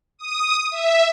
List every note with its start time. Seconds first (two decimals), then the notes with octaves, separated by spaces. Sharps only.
0.18 D#6
0.70 E5